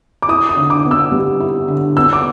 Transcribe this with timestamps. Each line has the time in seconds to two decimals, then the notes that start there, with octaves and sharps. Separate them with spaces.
0.22 D6
0.29 E4 D#6
0.49 D#6
0.56 D3
0.70 D6
0.85 B3
0.91 E6
1.12 G3
1.40 E4
1.68 D3
1.97 B3 E6
2.13 D6